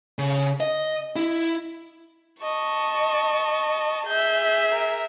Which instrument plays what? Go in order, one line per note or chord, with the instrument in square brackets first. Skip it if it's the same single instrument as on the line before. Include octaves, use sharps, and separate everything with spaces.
[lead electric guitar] C#3
D#5
E4
[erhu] D#5 [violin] A5 C#6
[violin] G#4 E5 [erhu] G6
[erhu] A#4